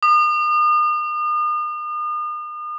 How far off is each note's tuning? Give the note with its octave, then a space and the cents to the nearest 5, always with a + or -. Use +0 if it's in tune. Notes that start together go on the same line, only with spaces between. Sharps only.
D#6 -40